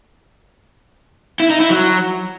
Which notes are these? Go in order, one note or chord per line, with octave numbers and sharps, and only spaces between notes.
E4
D#4
E4
F#3